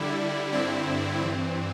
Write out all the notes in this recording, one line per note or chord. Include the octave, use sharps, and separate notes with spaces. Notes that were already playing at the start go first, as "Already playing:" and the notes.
Already playing: D3 G3 E4
G2 D3 C4 E4
G2 E3 C4